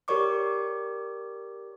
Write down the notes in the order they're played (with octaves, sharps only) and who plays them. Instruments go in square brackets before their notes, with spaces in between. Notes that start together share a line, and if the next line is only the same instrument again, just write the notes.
[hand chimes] G4 A#4 C#5 D5 C#6 D6